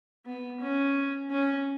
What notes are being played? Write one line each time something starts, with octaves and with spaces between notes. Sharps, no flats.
B3
C#4
C#4